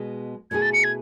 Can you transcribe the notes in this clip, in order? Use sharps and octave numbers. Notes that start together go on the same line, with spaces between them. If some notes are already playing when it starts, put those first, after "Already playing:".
Already playing: B2 G#3 B3
B2 A3 E4 G#4 G#6
A6
C#7
G#6